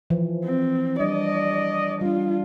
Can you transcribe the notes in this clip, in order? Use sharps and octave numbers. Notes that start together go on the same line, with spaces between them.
E3 F3
C4
G3 D4 D5 D#5
G3 D4 F4